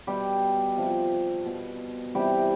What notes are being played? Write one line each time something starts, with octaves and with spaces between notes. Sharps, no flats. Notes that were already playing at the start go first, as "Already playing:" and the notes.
B2 G3 G4
C3 F3
B2
C3 E3 G3 G4